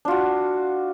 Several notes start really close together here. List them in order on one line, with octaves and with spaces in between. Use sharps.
D4 F4 F#4